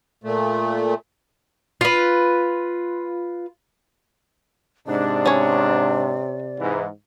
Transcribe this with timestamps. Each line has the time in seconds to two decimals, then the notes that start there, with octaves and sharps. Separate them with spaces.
0.24 A#2 A3
1.81 F4 B4
4.87 G#2 C3 D4 D5
5.26 C#4 C#5
6.59 G#2 E3